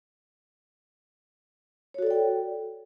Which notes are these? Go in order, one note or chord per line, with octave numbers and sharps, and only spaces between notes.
F#4 A4 C#5 D5 G5